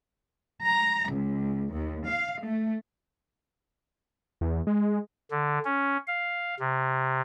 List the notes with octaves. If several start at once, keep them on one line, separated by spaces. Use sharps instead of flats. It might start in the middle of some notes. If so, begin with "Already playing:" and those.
A#5
C#2
D#2
F5
A3
E2
G#3
D3
C#4
F5
C3